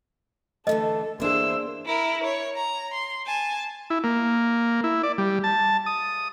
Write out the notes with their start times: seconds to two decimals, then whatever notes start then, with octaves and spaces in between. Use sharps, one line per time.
0.67 D3 E3 A3 A4 D#5
1.20 E2 A#3 D4 E4 G#4 C5 E6
1.86 E4 A#4
2.24 C#5
2.56 A#5
2.94 C6
3.26 G#5 A5
3.90 E4
4.04 A#3
4.84 E4
5.03 D5
5.18 G3
5.44 A5
5.86 D#6